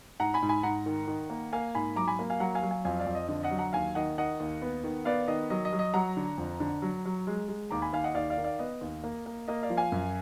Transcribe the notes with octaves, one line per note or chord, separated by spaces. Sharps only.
G#2 F#5 A#5
G#5 B5
G#2
G#5 B5
G#2 F#5 A#5
D#3
D#3
A#3
A#3 F5 G#5
G#2 G#5 B5
F#3 A#5 D6
G#5 B5
A#3
F5 G#5
F#3 F#5 A#5
F5 G#5
F#3
F5 G#5
F2 F5 G#5
D5 F5
F2
D#5
D3 D#5
D#5 F#5
F#3
F#5 A#5
D#2 F5 G#5
D#3 D#5 F#5
D#3 D#5 F#5
D#2
B3
D#3
B3 D5 F5
D#3 D#5
F#3 D#5
D#5
F#3
D#5
F#3 F#5 A#5
D3
F2
D3
F#3
F#3
G#3
G#3
D#2 A#5 D6
G#5 B5
D#2 F5 G#5
D#5 F#5
D#2 D5 F5
D5 F5
D#3
D5 F5
B3 D#5
D#2
A#3
A#3
A#3 D#5
D5 F5
F3
F5 G#5
F#2